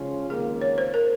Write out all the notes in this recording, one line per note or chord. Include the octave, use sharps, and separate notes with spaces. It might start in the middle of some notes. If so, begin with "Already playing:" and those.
Already playing: C#3 F3 G#3 C#4 F4
C#2 C3 D#3 A#3 G#4
C#5
C5
A#4